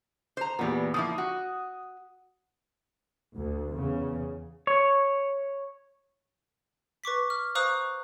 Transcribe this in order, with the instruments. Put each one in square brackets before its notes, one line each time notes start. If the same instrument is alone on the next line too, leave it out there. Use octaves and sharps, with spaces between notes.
[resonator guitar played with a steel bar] C5 A#5
[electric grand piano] E2 A#2 [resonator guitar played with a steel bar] G3 B3
[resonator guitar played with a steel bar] F3 A#3 E4 [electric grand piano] D#6
[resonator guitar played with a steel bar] F#4
[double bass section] D2
E2 C#3
[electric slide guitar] C#5
[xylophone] B4 C#6 D6 B6
F6
C5 F5 A#5 C#6 D#6 F#6